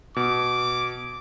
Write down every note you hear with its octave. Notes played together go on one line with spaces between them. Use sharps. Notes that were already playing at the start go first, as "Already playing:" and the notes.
B2 D6